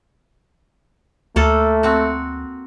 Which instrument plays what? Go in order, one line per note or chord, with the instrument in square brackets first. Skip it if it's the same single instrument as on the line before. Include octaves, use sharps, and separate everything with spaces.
[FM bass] D2 [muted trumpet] A3 [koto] A#3 A4
[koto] C4 F#4